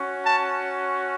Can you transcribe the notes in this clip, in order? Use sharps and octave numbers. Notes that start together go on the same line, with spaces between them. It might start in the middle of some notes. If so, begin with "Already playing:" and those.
Already playing: C#4 F#4
A5